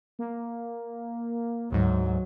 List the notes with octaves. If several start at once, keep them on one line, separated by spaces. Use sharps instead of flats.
A#3
D2 G#2 F#3